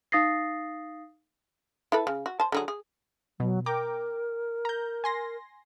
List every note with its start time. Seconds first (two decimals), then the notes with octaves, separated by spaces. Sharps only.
0.12 D#4 F5 D#6 A6 A#6 C7
1.92 E4 A4 B4
2.07 C#3
2.26 F#4
2.40 C5 A5
2.52 D3 F#3 G#4
2.68 G#4
3.40 B2 F#3
3.66 A#4 G5 A#5 D6
4.65 A#5 G6
5.04 G#5 C6 A#6